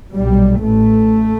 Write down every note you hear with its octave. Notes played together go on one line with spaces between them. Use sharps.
B1 A#2 G3
A1 A2 A3